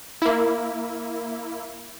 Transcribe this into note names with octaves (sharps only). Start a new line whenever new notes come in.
A#3 E4